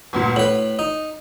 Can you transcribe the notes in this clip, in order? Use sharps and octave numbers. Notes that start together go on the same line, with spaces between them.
G1 D2 A#2
A2 B4 F#7
D#4